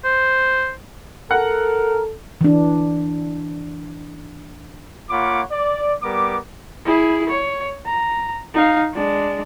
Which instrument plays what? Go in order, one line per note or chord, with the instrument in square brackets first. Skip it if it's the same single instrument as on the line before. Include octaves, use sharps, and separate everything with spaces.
[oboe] C5
[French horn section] A4 [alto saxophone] A#4 [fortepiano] F#5
[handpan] E3 D4
[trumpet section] A#3 F4 C#5 F#5 B5 D6
D5
G3 B3 A#4 D6
[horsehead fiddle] E4 G#4
C#5
A#5
D#4 F5
G#3 D4